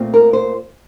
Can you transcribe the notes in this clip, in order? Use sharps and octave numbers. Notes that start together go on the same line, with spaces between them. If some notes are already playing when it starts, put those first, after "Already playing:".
Already playing: A#2 A3 C4
A#4
C5